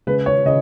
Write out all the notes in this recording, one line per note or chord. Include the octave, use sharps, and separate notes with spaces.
C#3 G#3 B4
C#5
C#3 D#5